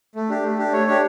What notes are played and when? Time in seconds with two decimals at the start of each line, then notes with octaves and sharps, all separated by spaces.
0.16 A3
0.29 D4 G4
0.43 A3
0.58 D4 G4
0.72 A3 C#5
0.87 D4 G4 C#5